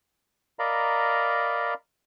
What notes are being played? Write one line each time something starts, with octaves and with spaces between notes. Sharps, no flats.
A#4 D5 D#5 F5 A#5 B5